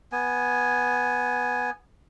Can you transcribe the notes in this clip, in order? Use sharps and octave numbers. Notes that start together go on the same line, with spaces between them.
B3 G#5